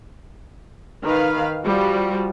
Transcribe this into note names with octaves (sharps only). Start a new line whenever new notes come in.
D#3 B4 F5
F3 G3 F#4